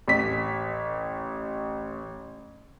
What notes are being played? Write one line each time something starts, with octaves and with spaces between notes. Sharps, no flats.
A1 B6